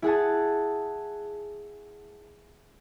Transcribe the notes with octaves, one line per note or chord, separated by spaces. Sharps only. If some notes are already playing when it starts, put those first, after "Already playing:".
E4 G#4 F#5 A5